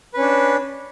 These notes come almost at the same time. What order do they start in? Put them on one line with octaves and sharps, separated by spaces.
B4 C#4 D4